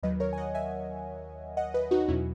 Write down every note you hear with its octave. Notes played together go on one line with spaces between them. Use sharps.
D#2 D#3 F#3 B4 D#5
A#4 C#5
G#5
D#5 F#5
E5 G#5
D#5 F#5
B4 D#5
D#4 F#4
E2 B2 F#3 C#4 E4